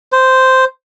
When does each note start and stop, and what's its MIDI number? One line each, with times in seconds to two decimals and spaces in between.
0.12 0.65 72